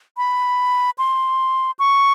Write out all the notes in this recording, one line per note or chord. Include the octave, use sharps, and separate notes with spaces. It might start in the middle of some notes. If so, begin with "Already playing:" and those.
B5
C6
C#6